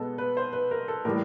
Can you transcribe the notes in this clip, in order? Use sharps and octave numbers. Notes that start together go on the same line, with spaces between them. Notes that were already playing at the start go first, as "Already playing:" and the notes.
Already playing: B2 G#3 B3 A4
B4
C5
B4
A#4
A4
A2 E3 G3 A#4